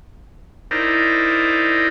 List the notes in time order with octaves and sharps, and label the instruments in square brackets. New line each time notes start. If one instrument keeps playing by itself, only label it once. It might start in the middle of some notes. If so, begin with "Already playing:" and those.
[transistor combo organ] D#4 E4 A#4 C5 D5